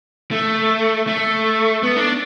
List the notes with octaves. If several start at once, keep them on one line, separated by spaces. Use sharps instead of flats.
A3
A3
B3
D4